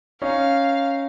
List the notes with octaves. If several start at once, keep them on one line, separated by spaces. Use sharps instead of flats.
C#4 D#4 F5